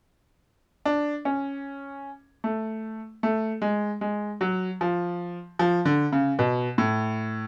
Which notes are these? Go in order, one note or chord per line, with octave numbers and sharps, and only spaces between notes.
D4
C#4
A3
A3
G#3
G#3
F#3
F3
F3
D3
C#3
B2
A2